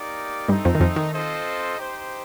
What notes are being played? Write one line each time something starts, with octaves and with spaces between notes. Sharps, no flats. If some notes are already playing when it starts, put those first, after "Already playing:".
Already playing: A#3 D#4 G4 A#4 D5
G2 G3 A3 C4 D#4 A4
F2 F3
D#3
F2 F3
D#3
C4 F4 A4 C5 D#5
D#4 G4 C5